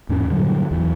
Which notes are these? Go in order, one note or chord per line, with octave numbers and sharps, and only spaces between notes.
E2 G#2 C#4
G2 A#2 D3 F#3
E2 E3 F#3